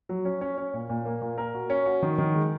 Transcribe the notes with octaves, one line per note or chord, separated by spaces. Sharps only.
F#3
C#4
C#4
C#4
A#2
A#2
A#3
A#2
A#4
F#4
C#4
F#4
D#3
D#3
G#3